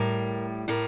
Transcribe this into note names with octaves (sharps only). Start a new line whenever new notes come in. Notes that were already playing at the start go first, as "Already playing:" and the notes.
Already playing: A2 G3 A#4
A2 G3 A#4